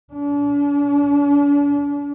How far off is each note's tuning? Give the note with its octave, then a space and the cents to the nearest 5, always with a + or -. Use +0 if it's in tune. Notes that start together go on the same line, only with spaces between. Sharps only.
D4 -40